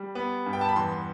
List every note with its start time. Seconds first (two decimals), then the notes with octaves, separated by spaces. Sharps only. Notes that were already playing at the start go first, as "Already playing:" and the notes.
Already playing: G3
0.15 B3
0.46 G2
0.53 G5
0.61 A5
0.69 B5
0.76 E2 C6